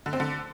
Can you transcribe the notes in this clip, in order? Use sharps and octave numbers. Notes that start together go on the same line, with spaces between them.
D3
C4
D3